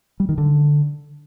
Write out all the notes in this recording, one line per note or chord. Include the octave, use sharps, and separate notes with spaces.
G3
D#3
D3